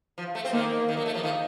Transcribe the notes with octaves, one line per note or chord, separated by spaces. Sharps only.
F3
A3
C4
D#3 A#3
D#3
F#3
A3
F3
D#3